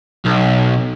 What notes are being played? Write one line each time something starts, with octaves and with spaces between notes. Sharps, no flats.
B1